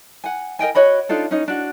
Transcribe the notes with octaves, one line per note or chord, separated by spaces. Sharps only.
F#5 G#5
A#4 D#5 G5 G#5
F#4 C#5 D#5 B5
D4 D#4 F4 A4
C#4 D#4
D4 F#4